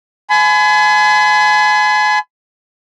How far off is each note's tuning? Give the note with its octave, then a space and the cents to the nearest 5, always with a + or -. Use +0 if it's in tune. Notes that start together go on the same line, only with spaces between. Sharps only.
G#5 +30 B5 +40